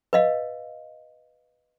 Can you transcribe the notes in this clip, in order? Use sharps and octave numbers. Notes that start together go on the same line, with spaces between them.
B4 D#5 F5